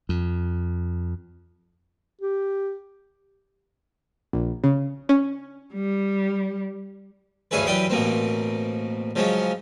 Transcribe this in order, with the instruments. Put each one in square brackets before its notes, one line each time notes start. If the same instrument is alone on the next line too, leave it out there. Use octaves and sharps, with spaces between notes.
[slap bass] F2
[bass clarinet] G4
[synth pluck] A#1
C#3
C#4
[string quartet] G3
[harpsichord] D2 G2 C#4 E4 G#4 B4
F#2 E3 G3 B4 G5 D#6
A1 B2 A#3 C4
C#3 F3 F#3 G#3 C#4